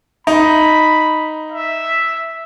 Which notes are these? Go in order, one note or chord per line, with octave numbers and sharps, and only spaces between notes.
D#4 B5
E5